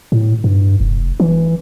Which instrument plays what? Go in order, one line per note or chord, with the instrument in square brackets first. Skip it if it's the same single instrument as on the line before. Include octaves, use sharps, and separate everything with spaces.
[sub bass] A2
G2
F1
E3